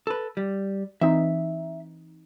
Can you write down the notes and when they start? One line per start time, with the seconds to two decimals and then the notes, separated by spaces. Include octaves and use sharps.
0.07 A4 B4
0.37 G3
1.02 E3 C4 D#4 E5